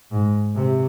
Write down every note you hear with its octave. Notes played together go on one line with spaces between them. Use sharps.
G#2
C3